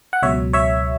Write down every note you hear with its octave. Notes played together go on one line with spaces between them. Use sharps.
F#5
C#2 B2 F#3 C#5 E5
C#5 E5